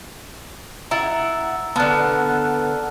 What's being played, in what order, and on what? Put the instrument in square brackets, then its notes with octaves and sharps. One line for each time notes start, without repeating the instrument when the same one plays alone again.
[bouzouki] E4 F#5 [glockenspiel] A#5 E6 A6
[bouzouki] D3 B3 [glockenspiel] A5 F6 F#6